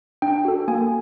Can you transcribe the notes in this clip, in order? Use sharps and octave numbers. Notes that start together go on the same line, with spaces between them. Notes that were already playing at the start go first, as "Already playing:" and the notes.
D4 G5
F#4 A4
A#3 G#5